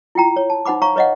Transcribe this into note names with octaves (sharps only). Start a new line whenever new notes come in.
E4 F4 G5 A#5
C#5
A5
D#4 C5 F#5 B5 D6
C#5 F5 A#5 C#6
B4 C#5 D#5 F5 F#5